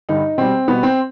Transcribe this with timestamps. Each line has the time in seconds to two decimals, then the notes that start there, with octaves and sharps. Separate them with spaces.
0.09 G2 D3 G3 D#4
0.38 B2 G3 C4
0.67 B2 G3 B3
0.83 C4